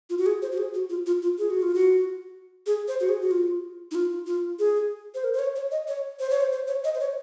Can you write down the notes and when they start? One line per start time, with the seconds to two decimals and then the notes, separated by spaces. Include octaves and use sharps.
0.10 F4
0.18 F#4
0.26 G#4
0.42 C5
0.52 F#4
0.58 G#4
0.74 F#4
0.90 F4
1.06 F4
1.22 F4
1.38 G#4
1.50 F#4
1.62 F4
1.75 F#4
2.66 G#4
2.88 C5
3.00 F#4
3.09 G#4
3.22 F#4
3.31 F4
3.91 D#4
3.95 F4
4.27 F4
4.59 G#4
5.15 C5
5.24 A#4
5.34 C5
5.39 C#5
5.56 C#5
5.71 D#5
5.88 C#5
6.20 C5
6.30 C#5
6.41 C5
6.52 C5
6.68 C#5
6.84 D#5
6.95 C5
7.00 C#5